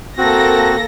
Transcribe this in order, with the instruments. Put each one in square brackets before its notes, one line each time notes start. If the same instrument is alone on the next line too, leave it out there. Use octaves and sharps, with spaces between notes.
[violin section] A#3 A4 A#6 [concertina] C4 F#4